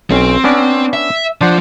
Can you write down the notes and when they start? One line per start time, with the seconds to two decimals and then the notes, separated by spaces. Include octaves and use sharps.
0.11 B1 C4 C#4
0.44 B3 C#4 D4
0.93 E5
1.41 F3 D4 C5 F#5